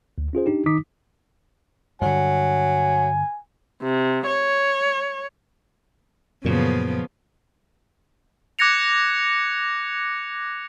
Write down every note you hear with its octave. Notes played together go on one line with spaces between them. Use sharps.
D2
C#4 F4 G#4 C5
D4 D#4 G4
D#3 D#4 D6 D#6 B6
G2 D3 F#3 G#5
C3
C#5
F#2 A#2 C#3 F3 B3
D6 F#6 G#6 A#6 C#7 F7